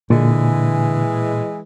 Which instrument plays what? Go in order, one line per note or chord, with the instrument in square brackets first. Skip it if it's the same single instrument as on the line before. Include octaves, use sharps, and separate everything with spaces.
[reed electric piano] A#2 [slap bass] D3 [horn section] E3 G#3